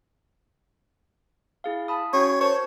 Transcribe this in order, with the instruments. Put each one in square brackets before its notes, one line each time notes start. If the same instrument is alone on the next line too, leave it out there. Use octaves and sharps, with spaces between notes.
[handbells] E4 G#4 F5
A5 B5 D#6
[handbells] C#4 F#4 G5 [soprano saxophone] C#5
[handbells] A#4 C5 A5 [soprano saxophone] C#5